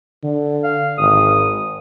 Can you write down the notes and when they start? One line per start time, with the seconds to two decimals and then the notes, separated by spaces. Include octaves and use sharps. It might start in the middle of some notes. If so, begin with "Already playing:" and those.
0.24 D3
0.64 F5
0.98 G#1 D#6